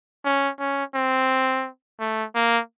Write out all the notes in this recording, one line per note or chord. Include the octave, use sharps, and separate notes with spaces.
C#4
C#4
C4
A3
A#3